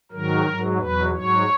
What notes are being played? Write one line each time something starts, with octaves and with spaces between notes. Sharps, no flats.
G#2 D#3 F#3 A#4
G#2 F#3
E2 B2 F#3 B4
G#2 F#3 C#5